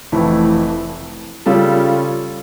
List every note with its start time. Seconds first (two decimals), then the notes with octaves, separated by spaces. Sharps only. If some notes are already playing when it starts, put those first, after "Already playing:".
0.12 F1 F2 E3 A3 E4
1.46 C#3 G3 C#4 F4 A4